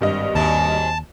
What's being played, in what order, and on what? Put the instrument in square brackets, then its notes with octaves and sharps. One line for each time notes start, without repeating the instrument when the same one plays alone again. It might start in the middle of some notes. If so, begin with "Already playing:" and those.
[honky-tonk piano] G#1 G2 D#5
[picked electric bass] D#2 [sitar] G#2 F#3 [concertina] A5